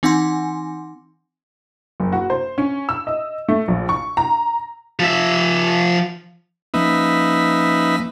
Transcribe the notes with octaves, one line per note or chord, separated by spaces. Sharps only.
E3 C4 D#4 F#5 G#5 C6
F#1
F#4
C5
C#4
E6
D#5
A3
A#1
C#6
A#5
F3 E5
F3 A#3 C#4 D#4 B4 E5